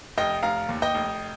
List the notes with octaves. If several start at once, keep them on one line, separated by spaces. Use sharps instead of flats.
F1 D#5 G5
F1 F5 A#5
D#2
D#5 G5
F1